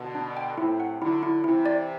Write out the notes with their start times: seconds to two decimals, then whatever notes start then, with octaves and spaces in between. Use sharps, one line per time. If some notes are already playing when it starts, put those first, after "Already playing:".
Already playing: B2 D3
0.15 D4
0.37 G5
0.58 A2 C3 E4
0.80 F#5
1.01 D3 F#3 E4
1.23 E4
1.44 C3 E3 E4
1.66 D5